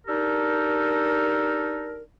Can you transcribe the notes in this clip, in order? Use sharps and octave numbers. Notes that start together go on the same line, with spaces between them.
D4 D#4 G4 A4 A#4